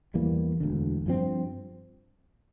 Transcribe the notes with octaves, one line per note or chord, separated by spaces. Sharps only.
E2 E3 G3 A#3
E1 D2 D3
G2 F3 C4